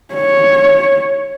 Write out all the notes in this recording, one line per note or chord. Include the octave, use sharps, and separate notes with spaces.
C#5